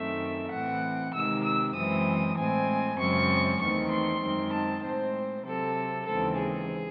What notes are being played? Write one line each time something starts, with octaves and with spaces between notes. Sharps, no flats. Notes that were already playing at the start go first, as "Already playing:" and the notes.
Already playing: F#2 D#3 A3 C4 E5
A2 E3 C4 F#5
C3 D#3 G#3 E6
E6
F#2 E3 G#3 C4 D#6
A2 G#3 C4 G#5
F#2 C#3 G#3 C4 C#6
E2 D#3 A3 C4 C#6
C6
F#2 D#3 G#3 C4
A5
A2 G#3 C4 C5
C3 F#3 C4 A4
D#2 C#3 E3 G#3 C4 A4
G#4